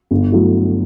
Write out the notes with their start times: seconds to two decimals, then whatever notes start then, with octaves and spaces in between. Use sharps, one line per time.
0.11 G1
0.32 F#3 A3 E4